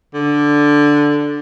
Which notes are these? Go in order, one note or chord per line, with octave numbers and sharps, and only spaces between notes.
D3